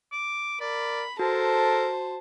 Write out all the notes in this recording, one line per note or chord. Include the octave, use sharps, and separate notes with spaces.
D6
A#4 D5 B5
F#4 A4 A#4 C5 A5